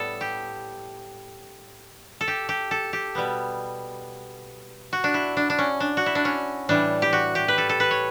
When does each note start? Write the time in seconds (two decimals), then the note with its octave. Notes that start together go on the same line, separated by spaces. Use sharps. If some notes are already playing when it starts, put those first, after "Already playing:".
Already playing: A2 G3 B3 A4 D5
0.21 G4
2.21 A4
2.28 G4
2.49 G4
2.71 A4
2.93 G4
3.15 B2 G3 B3
4.93 F#4
5.04 D4
5.14 E4
5.37 D4
5.50 D4
5.58 C#4
5.80 D4
5.97 F#4
6.06 E4
6.15 D4
6.25 C#4
6.69 A2 E3 G3 D4
7.02 G4
7.13 F#4
7.35 G4
7.48 B4
7.58 A4
7.69 A4
7.80 B4
7.91 C#5